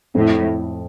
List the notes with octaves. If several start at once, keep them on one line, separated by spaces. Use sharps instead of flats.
F2 A2